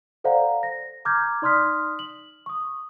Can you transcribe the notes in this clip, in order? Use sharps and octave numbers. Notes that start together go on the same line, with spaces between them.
A4 C5 D5 F5 F#5 A#5
A#6
A#5 D6 F6 G6 G#6
D#4 D5 C6 D#6 F6 B6
F#7
C#6 D#6